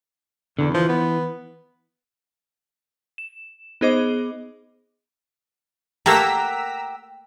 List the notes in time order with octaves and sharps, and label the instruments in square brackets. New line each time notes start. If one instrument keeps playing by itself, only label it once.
[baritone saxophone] E2 [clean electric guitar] D3
[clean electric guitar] E3 [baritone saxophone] F3
[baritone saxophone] B3
[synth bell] E7
B3 D#4 G#4 C5 D#5 D6
[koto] A3 A#3 [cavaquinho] G4 A#4 F#5 [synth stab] A#5 E6 B6